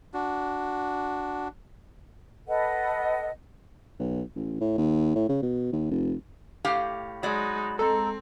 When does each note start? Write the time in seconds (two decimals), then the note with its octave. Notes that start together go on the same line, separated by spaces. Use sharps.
0.14 D4 F#4
2.48 A4 B4 D#5 F#5
3.99 B1
4.36 A1
4.61 A2
4.78 D#2
5.15 A2
5.29 C#3
5.42 B2
5.72 D#2
5.91 F1
6.65 A2 G4 F5
7.23 F#3 G#3 D#4 D5 B5
7.79 G#3 C4 A4 A#5